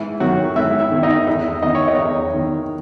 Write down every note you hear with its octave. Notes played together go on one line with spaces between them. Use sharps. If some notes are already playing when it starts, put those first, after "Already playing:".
Already playing: G#2 E3 E4
D#3 F#3 F#4
G#2 E4 E5
E4 E5
D#3
D#4 D#5
E2 E4 E5
D#3 D#5
C#5
D#4 D#5
E2
D#3